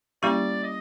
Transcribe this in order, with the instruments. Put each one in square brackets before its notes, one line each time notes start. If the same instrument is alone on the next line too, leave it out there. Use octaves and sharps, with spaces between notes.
[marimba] G3 A#3 C#4 E4 G4 [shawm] D5
[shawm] D#5